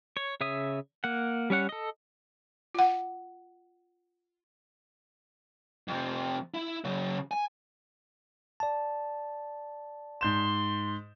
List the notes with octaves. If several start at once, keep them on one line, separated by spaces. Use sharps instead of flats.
C#5
C#3 C#5 E5 D#6
A#3 F#5
G3 C#4 C#5 F#5
A4 D#5
F4 F#5
F2 C3
E4
C#3 F#3
G#5
D5 A5
G#2 C6 G6 E7